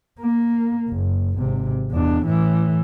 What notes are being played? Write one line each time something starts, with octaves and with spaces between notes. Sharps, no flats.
A#3
F#1
G#1 C3
E2 D4
A2 E3